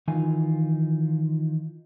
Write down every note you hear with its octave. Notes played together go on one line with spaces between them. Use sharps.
D#3 E3 D#4 F4 G#5